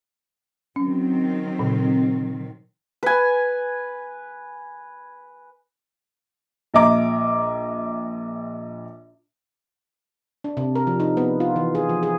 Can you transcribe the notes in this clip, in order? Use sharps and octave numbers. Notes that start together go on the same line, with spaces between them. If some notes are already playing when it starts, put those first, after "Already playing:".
D#3 F#3 C4 C#4
A#2 C#3
B4 G#5
A#1 D#5 E5 A#5 D6
D4
C3
A#4
F3
D#4
B3
F4
E3
G#4
F3
G#4